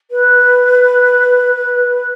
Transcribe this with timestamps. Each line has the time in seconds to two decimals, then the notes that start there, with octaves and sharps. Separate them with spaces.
0.11 B4